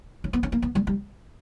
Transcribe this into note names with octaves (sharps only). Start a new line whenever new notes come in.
C#4
B3
C#4
A#3
B3
G3
G3